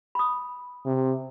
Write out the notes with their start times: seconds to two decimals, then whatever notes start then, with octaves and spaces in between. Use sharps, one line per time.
0.15 B5 D#6
0.86 C3